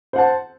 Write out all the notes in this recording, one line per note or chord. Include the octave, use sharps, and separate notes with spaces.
C5 F#5 A5